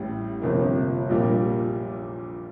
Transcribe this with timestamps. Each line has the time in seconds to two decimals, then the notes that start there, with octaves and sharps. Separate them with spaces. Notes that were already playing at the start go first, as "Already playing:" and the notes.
Already playing: A1 A2 G3
0.41 G1 F2 C3 F3 A#3
1.09 A#1 A#2 G3 A#3